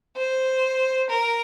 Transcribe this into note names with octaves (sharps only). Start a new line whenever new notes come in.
C5
A#4